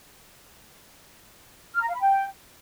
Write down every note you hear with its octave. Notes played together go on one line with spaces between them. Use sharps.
F6
A#5
F5
B5
G5